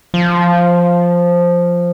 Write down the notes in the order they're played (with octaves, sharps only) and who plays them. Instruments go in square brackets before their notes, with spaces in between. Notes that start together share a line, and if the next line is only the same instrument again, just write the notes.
[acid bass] F3